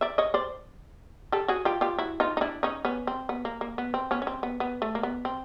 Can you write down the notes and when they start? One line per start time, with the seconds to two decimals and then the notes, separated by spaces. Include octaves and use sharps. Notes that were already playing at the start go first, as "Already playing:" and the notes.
0.01 D5 E5
0.18 C#5 D#5
0.34 C5 D5
1.32 G4 A4
1.48 F#4 G#4
1.65 F4 G4
1.81 F4 G4
1.99 E4 F#4
2.20 D#4 F4
2.37 D#4
2.41 D4 E4
2.63 C#4 D#4
2.85 B3 C#4
3.07 C4
3.29 B3
3.45 A#3
3.61 A#3
3.78 B3
3.94 C4
4.11 B3 C#4
4.22 C#4
4.27 C4
4.43 B3
4.60 B3
4.82 A3
4.95 A#3
5.03 B3
5.25 C4